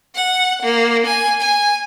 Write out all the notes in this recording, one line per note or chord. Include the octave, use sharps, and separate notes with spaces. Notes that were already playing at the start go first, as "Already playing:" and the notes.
F#5
A#3
G#5
G#5